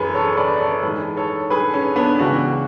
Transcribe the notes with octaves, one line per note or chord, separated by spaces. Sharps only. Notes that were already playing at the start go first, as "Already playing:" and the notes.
Already playing: F#2 E3 G#4 A4 B4
A4 C#5
B4 D5
A4 C#5
G#2 E3 G#4 B4
A4 C#5
G#4 B4
C#4
B3 D4
C#2 C#3 E3 D4 F#4